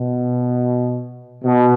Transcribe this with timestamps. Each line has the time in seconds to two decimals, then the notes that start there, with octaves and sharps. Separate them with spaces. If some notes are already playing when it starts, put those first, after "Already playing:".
Already playing: B2
1.44 B2